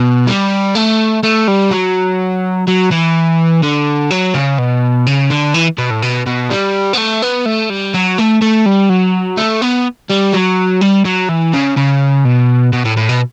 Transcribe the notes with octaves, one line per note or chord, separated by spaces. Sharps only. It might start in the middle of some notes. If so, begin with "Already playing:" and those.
Already playing: B2
G3
A3
A3
G3
F#3
F#3
E3
D3
F#3
C#3
B2
C#3
D3
E3
B2
A2
B2
B2
G3
B3
A3
B3
A3
G3
F#3
A3
A3
G3
F#3
A3
B3
G3
F#3
G3
F#3
E3
C#3
C#3
B2
B2
A2
A2
B2